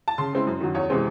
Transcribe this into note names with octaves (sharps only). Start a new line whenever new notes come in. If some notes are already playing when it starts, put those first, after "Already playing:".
A5
C#3 C6
G#3 C4 E4
F#2
D#3 F#3
E2 C#5
C3 E3 G#3 C4